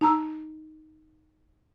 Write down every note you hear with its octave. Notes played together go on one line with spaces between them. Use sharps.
D#4 A5 A#5 E6